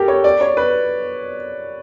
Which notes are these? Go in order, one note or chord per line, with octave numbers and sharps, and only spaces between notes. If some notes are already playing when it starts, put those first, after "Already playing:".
Already playing: G4 A4 A#4
C#5
D5
C#5
B4